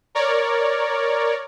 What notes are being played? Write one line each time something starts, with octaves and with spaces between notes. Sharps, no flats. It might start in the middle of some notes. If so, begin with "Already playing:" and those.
A#4 C#5 D5